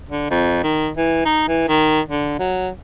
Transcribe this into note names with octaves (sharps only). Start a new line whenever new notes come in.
D3
F2
D#3
E3
D#4
E3
D#3
D3
F#3